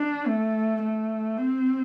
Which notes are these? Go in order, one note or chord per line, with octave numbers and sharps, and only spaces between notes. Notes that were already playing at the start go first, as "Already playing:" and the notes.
Already playing: D4
A3
A3
C4